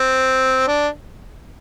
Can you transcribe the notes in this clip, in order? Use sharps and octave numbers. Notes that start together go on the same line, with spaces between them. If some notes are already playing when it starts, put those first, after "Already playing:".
Already playing: C4
D4